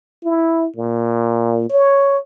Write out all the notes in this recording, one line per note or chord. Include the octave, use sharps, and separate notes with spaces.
E4
A#2
C#5